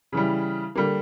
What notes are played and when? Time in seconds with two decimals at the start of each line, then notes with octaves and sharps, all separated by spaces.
0.12 C#3 E3 G3
0.75 D3 G3 A#3